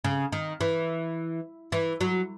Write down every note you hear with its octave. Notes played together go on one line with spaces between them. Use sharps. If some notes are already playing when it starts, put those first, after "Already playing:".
C#3
D#3
E3
E3
F#3